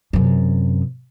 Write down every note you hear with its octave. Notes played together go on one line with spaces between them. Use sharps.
F#2 C3